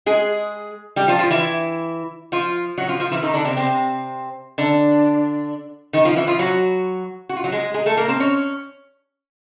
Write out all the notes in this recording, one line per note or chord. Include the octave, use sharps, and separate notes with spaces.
G#3 G#4
G3 G4
F3 F4
F3 F4
E3 E4
F3 F4
F#3 F#4
F3 F4
F3 F4
E3 E4
D#3 D#4
D3 D4
C3 C4
C3 C4
D3 D4
D#3 D#4
F3 F4
E3 E4
F3 F4
F#3 F#4
F#4
F4
F#3 F#4
G#3 G#4
G#3 G#4
A3 A4
A#3 A#4
C4 C5
C#4 C#5